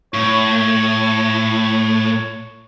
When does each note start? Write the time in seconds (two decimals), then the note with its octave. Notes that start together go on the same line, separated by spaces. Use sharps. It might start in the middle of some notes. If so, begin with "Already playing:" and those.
0.14 A2 C#5